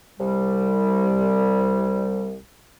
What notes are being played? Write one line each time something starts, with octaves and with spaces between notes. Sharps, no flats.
C2 G3